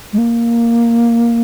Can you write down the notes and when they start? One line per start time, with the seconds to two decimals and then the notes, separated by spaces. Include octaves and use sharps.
0.13 G#3
0.18 A#3